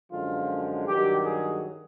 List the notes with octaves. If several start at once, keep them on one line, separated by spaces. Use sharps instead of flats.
F#2 D3 F3 G#3 F4
G2 D#3 F#3 G4
G#4